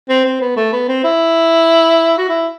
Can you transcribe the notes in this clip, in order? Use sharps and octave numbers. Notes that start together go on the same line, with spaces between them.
C4
C4
B3
A3
B3
C4
E4
F#4
E4